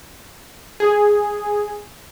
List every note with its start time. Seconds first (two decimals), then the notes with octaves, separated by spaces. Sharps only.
0.80 G#4